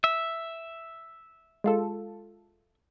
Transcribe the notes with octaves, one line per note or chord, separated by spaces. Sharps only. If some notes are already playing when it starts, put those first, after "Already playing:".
E5
G#3 F4 A4